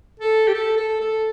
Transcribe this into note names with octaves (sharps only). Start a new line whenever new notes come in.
A4
G4
A4
A4
A4